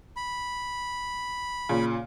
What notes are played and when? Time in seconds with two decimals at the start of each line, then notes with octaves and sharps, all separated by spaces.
0.17 B5
1.69 A#2 C#3